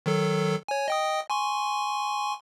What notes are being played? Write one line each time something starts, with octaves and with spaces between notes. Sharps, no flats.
D#3 F#3 A4
C#5 G#5
D#5 G5 D#6
G#5 C6 C#6